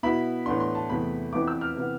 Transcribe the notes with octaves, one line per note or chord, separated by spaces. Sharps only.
B2 B3 E4 B5
A2 E3 B3 D4 C6
C6
A5
E2 C3 E3 A3 B5
F2 E3 B3 E4 D6
E6
F6
C3 E3 B3